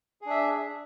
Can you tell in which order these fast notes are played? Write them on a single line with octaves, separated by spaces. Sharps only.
G#4 D4 E5